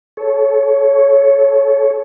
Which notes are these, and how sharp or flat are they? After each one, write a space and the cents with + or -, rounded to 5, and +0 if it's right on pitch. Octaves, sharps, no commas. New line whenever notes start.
A4 -30 C#5 +0